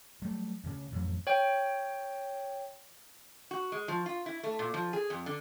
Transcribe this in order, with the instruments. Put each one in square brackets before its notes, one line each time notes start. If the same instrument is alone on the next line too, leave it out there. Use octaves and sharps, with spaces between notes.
[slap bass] F#3 G3 A3
D2 C#3
A1 F2 F#3
[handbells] C#5 G5
[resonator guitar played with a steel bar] F#4
G#3
F3
F4
E4
A3
A#2
F3
G#4
F2
D3